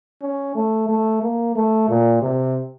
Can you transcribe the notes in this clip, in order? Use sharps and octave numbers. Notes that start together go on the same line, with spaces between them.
C#4
A3
A3
A#3
A3
A#2
C3